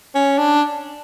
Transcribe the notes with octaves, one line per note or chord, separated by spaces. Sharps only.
C#4
D4